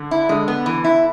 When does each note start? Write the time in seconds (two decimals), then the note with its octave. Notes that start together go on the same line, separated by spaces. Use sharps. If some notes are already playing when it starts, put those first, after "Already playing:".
Already playing: D3
0.11 E4
0.29 D3 G#3
0.48 B3
0.66 E3
0.84 E4